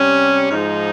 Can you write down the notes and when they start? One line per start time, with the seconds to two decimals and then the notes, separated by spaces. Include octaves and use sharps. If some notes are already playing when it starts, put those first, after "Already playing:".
Already playing: C3 G3 C#4
0.51 G#2 F3 G#3 D#4